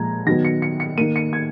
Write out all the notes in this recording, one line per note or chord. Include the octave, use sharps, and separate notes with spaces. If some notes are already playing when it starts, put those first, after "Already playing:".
Already playing: A#2 F3 G#3 A#5 G#6
D#3 F#3 B3 A#6
C#7
C#7
C#7
D#3 A#3 D#7
C#7
G#6